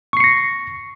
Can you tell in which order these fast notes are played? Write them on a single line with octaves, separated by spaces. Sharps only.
C#6 C7 C#7 A#6